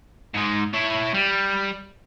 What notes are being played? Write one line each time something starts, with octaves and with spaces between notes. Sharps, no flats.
G#2 G#3
E4 C#5
G3